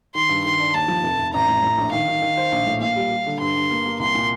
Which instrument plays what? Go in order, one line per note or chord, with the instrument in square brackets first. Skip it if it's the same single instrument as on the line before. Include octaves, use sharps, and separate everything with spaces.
[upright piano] D#3 [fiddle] C6
[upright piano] G2
[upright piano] D#3 [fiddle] C6
[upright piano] D4
[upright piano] D#2 [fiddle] A5
[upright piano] F3
F1
F1
[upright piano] A1 [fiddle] A#5
[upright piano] A2
A2
A#1
[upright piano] D#3 [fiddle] F5
[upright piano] D#3
D#3
C5
A#1
A2
[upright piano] A#2 [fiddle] F5
[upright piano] G3
G3
D3
[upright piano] G2 [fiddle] C6
[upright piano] G2
A#3
A#3
[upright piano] C2 [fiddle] C6
[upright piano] A#2